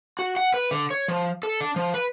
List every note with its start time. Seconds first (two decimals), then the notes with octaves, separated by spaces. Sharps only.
0.19 F#4
0.36 F#5
0.54 B4
0.71 D3
0.90 C#5
1.08 F3
1.43 A4
1.61 D4
1.76 F3
1.94 B4